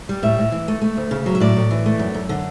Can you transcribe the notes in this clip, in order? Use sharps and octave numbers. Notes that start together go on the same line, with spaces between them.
G3
A2 E5
A2
E3
A3
A3
D2
C#3
F#3
E5
A2 D5
A2
E3
A3
F#2
F#2
D3